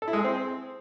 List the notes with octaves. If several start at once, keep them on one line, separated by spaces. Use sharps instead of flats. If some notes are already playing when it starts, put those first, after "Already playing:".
A4
E4
G#3
G#4
C4